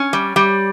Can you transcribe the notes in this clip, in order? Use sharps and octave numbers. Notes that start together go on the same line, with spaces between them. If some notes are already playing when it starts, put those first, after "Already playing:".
Already playing: C#4
G3
G3